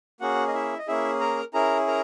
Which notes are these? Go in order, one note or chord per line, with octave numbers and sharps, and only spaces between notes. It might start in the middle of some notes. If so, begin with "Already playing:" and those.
A#3 C#4 F#4 G#4 F#5
D#5
E4 E5
D#5
A#3 C#4 E4 G#4 E5
A#4 A#5
C#4 E4 G#4 A#4 A#5
A#4 A#5